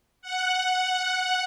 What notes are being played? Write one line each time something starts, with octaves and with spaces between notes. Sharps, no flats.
F#5